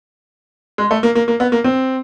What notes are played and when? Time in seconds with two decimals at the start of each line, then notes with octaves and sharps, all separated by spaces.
0.78 G#3
0.91 A3
1.03 A#3
1.15 A#3
1.28 A#3
1.40 B3
1.52 A#3
1.64 C4